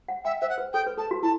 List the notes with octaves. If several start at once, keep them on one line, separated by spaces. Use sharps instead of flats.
F#5
E5 G5
C5 E5
F#5
B4
A4 G5
B4
A4 A5
F#4
E4 A5